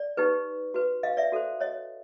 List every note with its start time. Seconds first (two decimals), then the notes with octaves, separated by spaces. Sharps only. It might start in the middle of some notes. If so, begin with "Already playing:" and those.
Already playing: D5
0.17 D#4 G4 B4
0.74 F#4 B4
1.03 D#5 F5
1.17 D5 E5
1.32 F#4 A4 C5
1.60 C#5 D#5